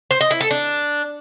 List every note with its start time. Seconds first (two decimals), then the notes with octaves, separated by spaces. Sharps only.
0.11 C5
0.21 D#5
0.31 E4
0.41 A4
0.51 D4